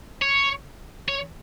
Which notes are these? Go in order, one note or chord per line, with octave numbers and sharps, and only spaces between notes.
C#5
C#5